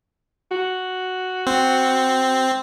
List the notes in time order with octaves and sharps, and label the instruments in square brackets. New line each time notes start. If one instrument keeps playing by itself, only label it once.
[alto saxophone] F#4
[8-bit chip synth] C4